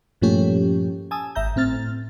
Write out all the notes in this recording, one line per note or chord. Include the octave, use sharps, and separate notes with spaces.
G2 A#2 F3 A3 C#4 G4
G#5 A5 D#6 E6
G#1 E5 A#5 G6
A2 C4 F6 A6